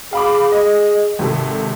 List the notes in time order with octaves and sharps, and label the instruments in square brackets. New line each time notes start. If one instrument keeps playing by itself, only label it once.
[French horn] G#4 [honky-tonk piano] F5 B5 D6
[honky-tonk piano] D#5
G#1 C3 A4